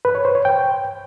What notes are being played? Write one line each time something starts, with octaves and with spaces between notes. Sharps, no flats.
B4
C#5
C5
C#5
G5